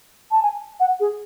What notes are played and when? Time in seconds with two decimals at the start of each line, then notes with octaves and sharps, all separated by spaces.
0.31 A5
0.43 G#5
0.80 F#5
1.00 G#4